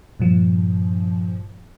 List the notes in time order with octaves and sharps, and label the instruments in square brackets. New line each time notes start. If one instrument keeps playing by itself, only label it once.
[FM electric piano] G2 A#2 F3